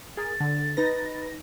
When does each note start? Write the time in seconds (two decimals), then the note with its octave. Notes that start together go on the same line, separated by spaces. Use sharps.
0.17 G#4 A#4 A6
0.40 D3
0.77 D#4 B4 A#6